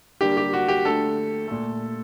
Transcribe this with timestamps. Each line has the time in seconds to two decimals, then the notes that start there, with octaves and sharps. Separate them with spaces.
0.21 D3 G3 A#3 G4
0.37 G4
0.53 F#4
0.68 G4
0.85 D3 A3 A4
1.48 A#2 A3